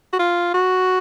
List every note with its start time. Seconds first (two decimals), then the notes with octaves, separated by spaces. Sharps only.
0.13 F#4
0.19 F4
0.54 F#4